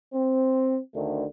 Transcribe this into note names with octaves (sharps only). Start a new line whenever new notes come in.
C4
D2 D3 D#3 A3